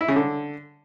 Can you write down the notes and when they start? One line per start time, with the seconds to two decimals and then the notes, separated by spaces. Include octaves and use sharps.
0.01 E4
0.08 C#3
0.16 D3